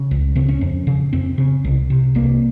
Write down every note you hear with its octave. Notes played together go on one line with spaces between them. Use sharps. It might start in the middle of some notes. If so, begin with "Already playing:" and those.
Already playing: C#3
C#2
C#3 C4
C#4
F2
C#3
F2 C4
C#3
C2
C3
C2 A#3